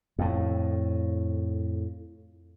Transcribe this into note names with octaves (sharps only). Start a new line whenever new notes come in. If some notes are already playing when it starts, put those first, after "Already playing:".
F2 A2